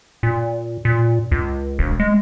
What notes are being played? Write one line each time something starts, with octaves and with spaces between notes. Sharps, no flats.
A#2
A#2
C#2
E1
G#3